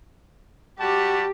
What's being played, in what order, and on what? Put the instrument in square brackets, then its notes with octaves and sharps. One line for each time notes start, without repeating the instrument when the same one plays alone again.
[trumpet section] G3 F#4 A5 [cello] G4